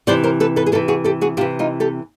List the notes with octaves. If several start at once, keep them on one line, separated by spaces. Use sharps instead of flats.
C3 E3 C5 D5
A#4 C5
A4 B4
A4 B4
G#4
C3 E3 G4 A4
F#4 G#4
G4 A4
F#4 G#4
C3 E3 F4 G4
D#4 F4
G4 A4